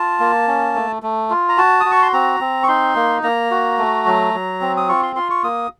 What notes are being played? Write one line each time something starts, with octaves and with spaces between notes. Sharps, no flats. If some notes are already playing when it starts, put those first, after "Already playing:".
Already playing: F4 A5
A#3
C#4
A3
A3
F4
A#5
F#4 A5
F#4 D#6
C#6
C6
C4 A#5
C4
C#6
D#4 C6
A#3
A#3 A#5
F#4
A3
F#3
F#3
C4
D#6
F4 C#6
C6
F4 C6
C#6
A#3 D#6